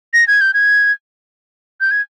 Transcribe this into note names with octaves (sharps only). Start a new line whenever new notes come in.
A#6
G#6
G6
G#6
G6
G#6